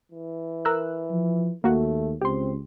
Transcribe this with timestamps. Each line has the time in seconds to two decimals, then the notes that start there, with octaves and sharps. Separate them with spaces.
0.12 E3
0.65 A#4 E6 F#6
1.11 F3
1.64 D#2 A3 A#3 F#4
2.21 C#2 C4 G4 C6